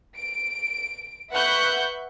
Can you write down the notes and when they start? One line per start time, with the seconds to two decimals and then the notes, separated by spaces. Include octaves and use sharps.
0.17 D7
1.32 B4 E5 F#5 C#6 F#6 G6